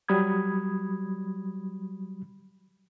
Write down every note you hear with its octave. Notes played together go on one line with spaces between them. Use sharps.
F#3 G3 B5 D#6 G#6